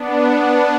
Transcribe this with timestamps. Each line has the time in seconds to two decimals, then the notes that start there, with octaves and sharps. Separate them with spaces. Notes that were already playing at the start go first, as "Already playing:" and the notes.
Already playing: B3 D4